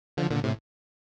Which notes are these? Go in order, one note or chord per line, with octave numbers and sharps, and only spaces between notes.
D3 F3
A#2 D3
A2 C3